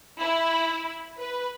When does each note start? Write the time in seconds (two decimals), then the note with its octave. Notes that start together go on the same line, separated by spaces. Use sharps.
0.20 E4
1.20 B4